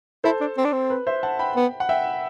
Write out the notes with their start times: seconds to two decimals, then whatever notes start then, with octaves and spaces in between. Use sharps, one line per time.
0.24 E4 A4 C5
0.41 D4
0.57 C4
0.65 D4
0.72 C4
0.90 B4
1.07 C5 E5
1.23 F#5 A5
1.39 G5 B5
1.56 B3
1.80 F#5
1.89 E5 G5